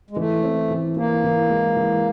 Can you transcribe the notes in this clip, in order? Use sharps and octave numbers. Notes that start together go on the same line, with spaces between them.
G#3
E3 A3
C4
E3
E3 A#3
E3
G#3
E3